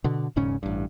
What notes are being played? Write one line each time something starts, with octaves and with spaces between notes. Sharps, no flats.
B2 D3
E1 G#2 C#3 C#4
A1 G2